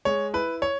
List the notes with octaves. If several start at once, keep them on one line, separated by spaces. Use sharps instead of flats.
G#3 C#5
E4 B4
C#5